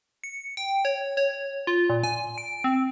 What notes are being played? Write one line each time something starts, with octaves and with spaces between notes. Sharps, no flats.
C#7
G5
C#5
C#5
F4
A#2
G#5
D7
C4